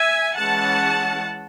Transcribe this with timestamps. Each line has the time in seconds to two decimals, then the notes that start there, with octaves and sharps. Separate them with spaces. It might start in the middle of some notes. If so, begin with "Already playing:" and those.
Already playing: E5 G#5
0.35 E3 G#3 C#4 F#5 A5